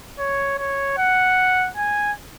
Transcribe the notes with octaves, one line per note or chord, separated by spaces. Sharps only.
C#5
C#5
F#5
G#5